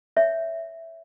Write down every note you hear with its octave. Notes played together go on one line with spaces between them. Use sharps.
C#5 E5